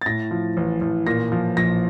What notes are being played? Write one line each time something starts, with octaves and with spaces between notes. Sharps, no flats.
A6
A2 A#6
F3
A1
A1
A#2 A#6
F3
A#1 A#6